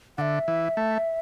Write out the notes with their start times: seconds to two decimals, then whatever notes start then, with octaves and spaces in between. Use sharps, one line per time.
0.17 D3 E5 F#5
0.48 E3
0.77 A3